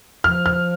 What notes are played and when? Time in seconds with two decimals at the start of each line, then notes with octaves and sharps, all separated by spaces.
0.24 F3 F6
0.46 F6